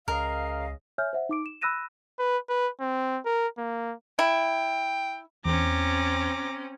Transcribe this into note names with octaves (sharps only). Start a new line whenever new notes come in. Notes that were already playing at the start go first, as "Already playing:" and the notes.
C#2 C#3 A#4 D#5 F5
C#5 E5 G#5 F6 G6
C5 E5 F#5
D#4 D6 D7
E7
B5 E6 F#6 A#6 D#7 E7
B4
B4
C4
A#4
A#3
E4 G5
E2 C4 C#4 A#5 D6